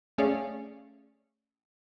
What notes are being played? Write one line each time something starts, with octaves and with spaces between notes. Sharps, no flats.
A3 C#4 G#4 C#5 D5 F5